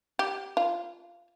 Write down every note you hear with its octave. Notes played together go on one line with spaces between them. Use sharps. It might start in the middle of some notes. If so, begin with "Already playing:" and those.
G4
F4